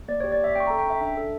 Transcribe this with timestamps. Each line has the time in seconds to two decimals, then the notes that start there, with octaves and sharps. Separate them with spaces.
0.08 A#3 D5
0.20 C#5
0.24 G4
0.32 D5
0.40 A#3 E5
0.55 C#4 G5
0.60 C#6
0.67 A#5
0.70 A4
0.79 G5
0.86 C#4 E5
1.01 D4 E5
1.17 A4